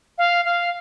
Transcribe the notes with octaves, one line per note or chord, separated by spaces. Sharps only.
F5
F5